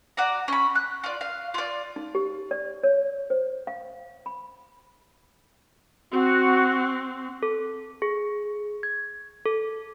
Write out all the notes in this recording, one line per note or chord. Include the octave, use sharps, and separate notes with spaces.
F#4 D5 A#5
C#4 B5
F#6
F4 D5
F5
F4 D5
D#4
G4
D5
C#5
C5
F5
B5
C4 F#4
A4
G#4
G#6
A4